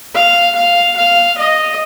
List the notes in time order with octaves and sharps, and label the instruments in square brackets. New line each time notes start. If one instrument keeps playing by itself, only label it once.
[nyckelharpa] F5
F5
F5
D#5